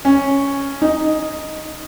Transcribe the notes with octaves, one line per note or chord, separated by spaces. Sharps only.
C#4
D#4